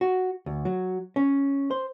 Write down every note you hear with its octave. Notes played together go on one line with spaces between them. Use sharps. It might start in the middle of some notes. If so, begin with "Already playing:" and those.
F#4
D2
F#3
C#4
C5